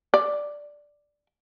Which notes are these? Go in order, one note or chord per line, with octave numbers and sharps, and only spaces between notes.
D5